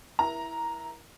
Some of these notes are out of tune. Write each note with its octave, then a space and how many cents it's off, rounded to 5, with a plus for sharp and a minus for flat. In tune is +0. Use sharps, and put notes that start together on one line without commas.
E4 +0 A#4 +35 A#5 +0